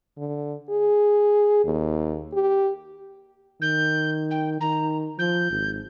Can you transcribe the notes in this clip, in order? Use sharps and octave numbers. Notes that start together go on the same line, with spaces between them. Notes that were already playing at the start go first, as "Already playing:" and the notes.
D3
G#4
D#2
G4
D#3 G6
G5
D#3 A#5
F3 G6
G#1